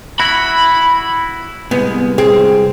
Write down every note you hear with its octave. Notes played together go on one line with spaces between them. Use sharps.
E4 F#4 B5
C2 G#3 B3
C4 G#4